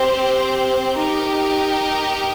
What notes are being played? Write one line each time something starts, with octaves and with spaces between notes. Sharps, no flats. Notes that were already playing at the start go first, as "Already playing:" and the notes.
Already playing: C4 G4 C5
D#4 G4 A#4